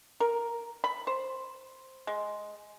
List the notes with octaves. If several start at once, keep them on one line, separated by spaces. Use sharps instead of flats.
A#4
B5
C5
G#3